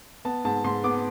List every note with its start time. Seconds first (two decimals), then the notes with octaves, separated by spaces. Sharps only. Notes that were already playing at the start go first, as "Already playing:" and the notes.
0.25 B3 A5
0.44 G#2 A5
0.64 G#2 C6
0.84 B3 D6